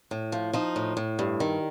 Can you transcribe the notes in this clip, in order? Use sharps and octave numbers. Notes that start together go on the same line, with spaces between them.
A2
F3
F3 D#4
A2
A2
G2
D#3